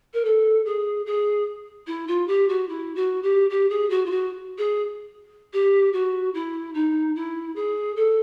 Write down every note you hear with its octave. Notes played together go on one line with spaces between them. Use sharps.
A#4
A4
G#4
G#4
E4
F4
G4
F#4
E4
F#4
G4
G4
G#4
F#4
F4
F#4
G#4
G4
F#4
E4
D#4
E4
G#4
A4